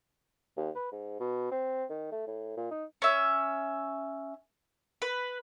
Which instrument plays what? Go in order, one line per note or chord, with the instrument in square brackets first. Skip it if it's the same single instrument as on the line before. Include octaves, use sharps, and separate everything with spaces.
[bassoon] D#2
B4
G#2
B2
C4
D#3
A3
A2
A#2
D#4
[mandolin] C#4 E5
B4